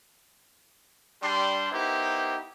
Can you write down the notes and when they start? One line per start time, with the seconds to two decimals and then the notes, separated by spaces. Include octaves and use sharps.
1.22 G3 D4 C6
1.71 B3 D#4 E4 G4 A#4 C5